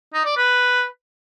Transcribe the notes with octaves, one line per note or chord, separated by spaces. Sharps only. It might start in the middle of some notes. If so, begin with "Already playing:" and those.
D#4
D5
B4